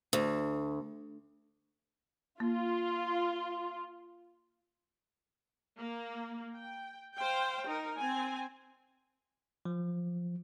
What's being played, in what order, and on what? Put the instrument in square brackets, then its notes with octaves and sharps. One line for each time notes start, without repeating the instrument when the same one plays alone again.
[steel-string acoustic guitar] D2
[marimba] A#3 [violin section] F4
[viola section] A#3
G5
C5 F5 G5
D#4 A#4
C4 G#5
[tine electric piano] F3